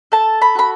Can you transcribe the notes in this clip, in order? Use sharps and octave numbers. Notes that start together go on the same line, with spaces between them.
A4 A5
B5
F#4 B5